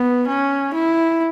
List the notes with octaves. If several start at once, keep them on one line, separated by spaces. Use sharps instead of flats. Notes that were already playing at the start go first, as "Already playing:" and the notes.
Already playing: B3
C#4
E4